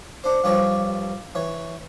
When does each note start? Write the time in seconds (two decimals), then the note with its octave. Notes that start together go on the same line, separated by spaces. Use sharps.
0.24 D4 C5
0.44 G2 F3 G4 C#5 D#6
1.35 E3 C#5